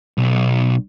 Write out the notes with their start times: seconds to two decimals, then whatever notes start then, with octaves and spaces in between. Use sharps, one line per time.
0.18 B1